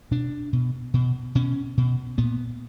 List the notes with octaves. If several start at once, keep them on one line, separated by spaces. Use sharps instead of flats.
B2 D4
B2
B2
B2 C#4
B2
A#2 B3